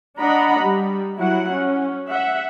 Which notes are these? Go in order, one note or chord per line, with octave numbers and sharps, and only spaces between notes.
D4 D#5 F#5 A#5 B5
G3
F#3 E4 F#5
C#4
E5 F#5